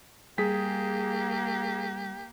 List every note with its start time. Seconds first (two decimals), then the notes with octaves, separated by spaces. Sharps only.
0.38 G3 A#3 G4 G#4 B6